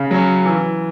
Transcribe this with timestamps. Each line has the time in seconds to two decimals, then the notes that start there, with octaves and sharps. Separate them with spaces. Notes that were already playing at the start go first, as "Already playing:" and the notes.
Already playing: C#3
0.11 F#3 C#4
0.45 E3